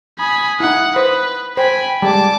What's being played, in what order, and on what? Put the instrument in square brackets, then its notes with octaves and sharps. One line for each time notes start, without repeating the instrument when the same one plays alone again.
[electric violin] G#5 B5 [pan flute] D#6
[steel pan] D#4 E4 [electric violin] F#5
[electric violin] B4 [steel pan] C5
[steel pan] C5 [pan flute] G5 [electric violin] G#5 B5
[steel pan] G3 G#3 [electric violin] A5 D6